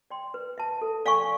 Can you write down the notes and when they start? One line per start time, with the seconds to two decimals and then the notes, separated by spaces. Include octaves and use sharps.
0.10 D5 G5 C6
0.34 B4
0.58 E5 A5
0.82 A4
1.06 D5 F5 G#5 C#6